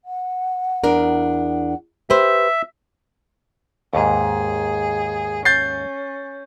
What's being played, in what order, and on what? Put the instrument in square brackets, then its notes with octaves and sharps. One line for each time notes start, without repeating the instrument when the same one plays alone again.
[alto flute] F#5
[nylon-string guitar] E2 D4 A#4
[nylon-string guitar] G4 B4 C5 [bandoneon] E5
[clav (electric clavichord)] D#2 G#2 [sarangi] G#4
[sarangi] C#4 [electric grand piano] G6 A6 C7